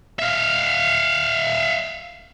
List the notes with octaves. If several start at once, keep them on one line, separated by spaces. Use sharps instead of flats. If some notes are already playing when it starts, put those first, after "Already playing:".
E5 F5